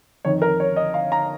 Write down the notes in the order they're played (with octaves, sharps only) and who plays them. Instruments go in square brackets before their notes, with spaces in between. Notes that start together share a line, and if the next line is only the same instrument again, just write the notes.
[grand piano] F2 D#3 C#5
A#4
C#5
D#5
F5
A#5